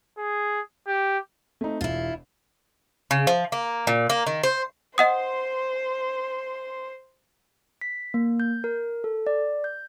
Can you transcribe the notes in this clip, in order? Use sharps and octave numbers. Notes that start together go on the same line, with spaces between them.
G#4
G4
A3 C4 D#4
E1 E4 F4
C#3
F3
A#3
A#2
A#3
D#3
C5
C5 D#5 F#5 C6 D#6
B6
A#3
G6
A#4
A4
D5
G6